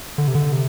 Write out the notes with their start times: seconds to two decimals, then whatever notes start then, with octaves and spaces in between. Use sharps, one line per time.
0.18 D3
0.28 C3
0.35 D3
0.52 C3